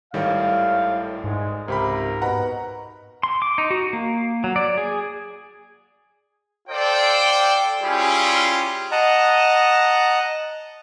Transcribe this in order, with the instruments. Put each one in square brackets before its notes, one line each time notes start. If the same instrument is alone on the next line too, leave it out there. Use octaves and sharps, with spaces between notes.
[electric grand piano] G#1 D#3 G3 [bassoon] A2 [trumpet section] F5
[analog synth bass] G#2 [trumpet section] G#3
[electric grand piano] C#2 G4 B5 [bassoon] C3 [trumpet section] A#4
[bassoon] B2 [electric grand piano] F#5 A#5 B5
[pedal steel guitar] C6
D6
D#4
F#4
A#3
F#3
D5
G#4
[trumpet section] F4 A4 C5 D5 G5
G3 C#4 E4 F4 G4 G#4
[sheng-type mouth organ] D#5 F#5 A5 A#5